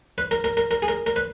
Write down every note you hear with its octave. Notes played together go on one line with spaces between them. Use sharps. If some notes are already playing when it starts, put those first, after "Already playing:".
B4
A#4
A#4
A#4
A#4
G#4
A#4
A#4
B4